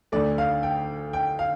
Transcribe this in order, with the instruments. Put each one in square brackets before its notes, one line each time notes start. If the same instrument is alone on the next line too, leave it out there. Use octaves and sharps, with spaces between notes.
[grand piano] D2 D3 A3 D5
F5
G5
G5
F5